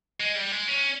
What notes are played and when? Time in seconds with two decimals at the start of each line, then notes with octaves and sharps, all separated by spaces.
0.20 G#3
0.35 G3
0.52 G#3
0.68 C#4